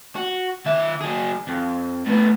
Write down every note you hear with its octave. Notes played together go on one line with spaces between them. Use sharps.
F#4
D#3 E5
F#3 G#4
F2
A2 B3